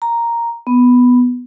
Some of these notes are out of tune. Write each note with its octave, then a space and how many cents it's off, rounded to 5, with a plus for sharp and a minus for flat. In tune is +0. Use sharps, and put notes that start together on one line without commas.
A#5 +0
B3 +0